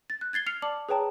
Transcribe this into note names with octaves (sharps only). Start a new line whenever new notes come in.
A6
F#6
G#6 A6 C7 G7
F6 C7 C#7 F7
D5 A5 D6 F#7
G#4 B4 C#5 G5 A5 A#5